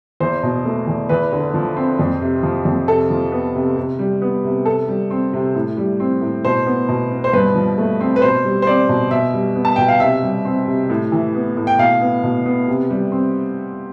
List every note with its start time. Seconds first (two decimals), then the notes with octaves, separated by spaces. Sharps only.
0.20 E2 C5
0.43 B2
0.65 A3
0.87 E2
1.09 E2 B4
1.33 D3
1.54 F3
1.76 C4
1.99 F2
2.21 C3
2.43 F3
2.65 F2
2.88 C3 A4
3.10 F3
3.32 B3
3.55 C3
3.77 C3
3.99 G3
4.22 B3
4.44 C3
4.66 C3 A4
4.89 G3
5.11 C4
5.33 C3
5.55 A2
5.77 G3
6.00 C4
6.21 A2
6.45 B2 C5
6.66 B3
6.89 B2
7.12 B3
7.24 C5
7.33 G2 B4
7.55 F3
7.78 A3
8.01 C4
8.16 B4
8.22 B2 C5
8.45 G3
8.62 C5
8.67 C4 D5
8.89 B2
9.11 B2 E5
9.34 G3
9.56 B3
9.65 A5
9.76 B2 G5
9.88 F5
10.00 C3 E5
10.23 G3
10.45 C4
10.67 C3
10.90 A2
11.12 E3
11.35 B3
11.57 A2
11.67 G5
11.79 B2 F5
12.01 B3
12.23 B2
12.46 B3
12.68 C3
12.90 G3
13.12 C4